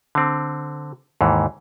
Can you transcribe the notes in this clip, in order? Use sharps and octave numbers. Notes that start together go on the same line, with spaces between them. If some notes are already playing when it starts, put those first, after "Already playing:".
D3 C4
D#2 G#2 E3